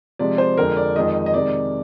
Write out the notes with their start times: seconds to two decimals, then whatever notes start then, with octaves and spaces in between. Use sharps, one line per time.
0.19 C3 F3 G#3 D5
0.38 C5
0.57 F2 D3 G#3 A#4
0.77 D5
0.96 F2 D#3 G#3 D#5
1.26 D#5
1.34 C3 D#3 G#3 D5